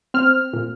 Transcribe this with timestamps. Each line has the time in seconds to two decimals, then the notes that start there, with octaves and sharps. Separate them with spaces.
0.14 C4 F6
0.53 A#2